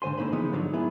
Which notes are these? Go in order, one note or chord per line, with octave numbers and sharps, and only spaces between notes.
G#2 D3 C5 G#5 C6
D3 A#3 D#4 C5 B5
C#3 E3 F3 G#3 B3 D#4
G#2 D3 F3 F#3
B3 E4 G#4